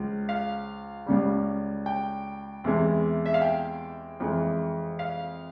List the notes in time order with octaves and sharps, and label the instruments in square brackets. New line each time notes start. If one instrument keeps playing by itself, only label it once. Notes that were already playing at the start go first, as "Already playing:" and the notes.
Already playing: [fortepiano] C#2 F3 G#3
F5
C#2 C#3 G3
G5
E2 C3 E3 G#3
E5
F5
G5
F2 E3 G#3
F5